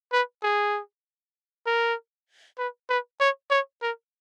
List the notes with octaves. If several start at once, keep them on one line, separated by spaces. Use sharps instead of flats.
B4
G#4
A#4
B4
B4
C#5
C#5
A#4